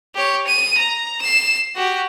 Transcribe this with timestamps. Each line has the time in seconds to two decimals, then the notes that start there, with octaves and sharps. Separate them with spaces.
0.15 G4 C#5
0.47 D#7
0.78 A#5
1.22 C7 E7
1.75 F#4 G4